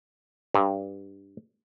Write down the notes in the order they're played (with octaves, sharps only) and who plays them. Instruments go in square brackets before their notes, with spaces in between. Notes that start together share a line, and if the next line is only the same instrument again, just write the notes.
[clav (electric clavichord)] G2